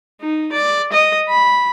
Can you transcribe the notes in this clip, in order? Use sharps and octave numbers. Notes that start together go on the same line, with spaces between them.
D#4
D5
D#5
B5